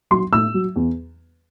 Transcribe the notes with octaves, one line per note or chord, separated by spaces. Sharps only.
F#3 C6
A2 E6
F#3
E2